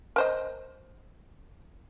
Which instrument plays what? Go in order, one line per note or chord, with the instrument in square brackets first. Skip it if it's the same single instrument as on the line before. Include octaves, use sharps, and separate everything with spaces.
[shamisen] A#4 C5 D#5